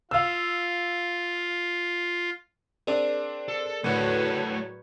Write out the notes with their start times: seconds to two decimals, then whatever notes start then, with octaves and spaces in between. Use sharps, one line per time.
0.11 F4 F5 E6
2.87 C4 D4 G#4 A#4 D5
3.48 A4
3.84 A2 D3 F#3 A3 B4 C#5 F#5